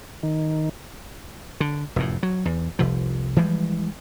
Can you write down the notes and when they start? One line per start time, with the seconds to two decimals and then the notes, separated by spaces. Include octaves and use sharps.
0.23 D#3
1.60 D3
1.96 F1 F#2 A2
2.23 F#3
2.45 E2
2.79 F1 C2 F3
3.36 E3 F3 G3 G#3